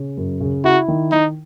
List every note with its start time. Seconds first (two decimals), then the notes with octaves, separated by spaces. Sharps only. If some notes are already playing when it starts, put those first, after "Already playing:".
Already playing: C#3 C#4
0.17 F#2
0.40 C#3
0.64 E4 F#4
0.88 D#3
1.12 D#3 D#4